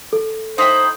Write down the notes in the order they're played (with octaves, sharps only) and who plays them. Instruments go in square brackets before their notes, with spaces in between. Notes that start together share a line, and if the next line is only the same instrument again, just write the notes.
[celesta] A4
[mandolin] D#4 E4 G5 [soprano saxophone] C5